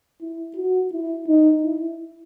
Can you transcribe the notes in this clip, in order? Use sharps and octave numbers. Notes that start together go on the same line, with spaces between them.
E4
F#4
E4
D#4
E4